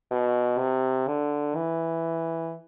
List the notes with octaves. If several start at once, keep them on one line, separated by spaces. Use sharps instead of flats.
B2
C3
D3
E3